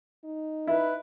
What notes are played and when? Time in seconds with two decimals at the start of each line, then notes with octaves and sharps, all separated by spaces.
0.25 D#4
0.67 E4 B4